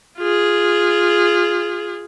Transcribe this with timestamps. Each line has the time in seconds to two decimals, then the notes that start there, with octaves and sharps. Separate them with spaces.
0.18 F4 G#4